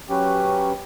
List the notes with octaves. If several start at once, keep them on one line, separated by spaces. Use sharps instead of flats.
F#3 C#4 G4 B4